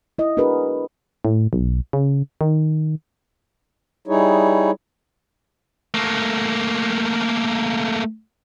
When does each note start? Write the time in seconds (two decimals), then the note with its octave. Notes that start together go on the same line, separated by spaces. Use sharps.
0.19 E4 D#5
0.37 D4 F#4 G#4 A#4 B4
1.25 A2
1.53 B1
1.93 C#3
2.41 D#3
4.08 G3 D#4 E4 G#4 C#5
5.94 A3 A#3